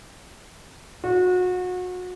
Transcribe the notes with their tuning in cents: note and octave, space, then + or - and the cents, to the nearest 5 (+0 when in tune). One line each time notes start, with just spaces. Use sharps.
F#4 -30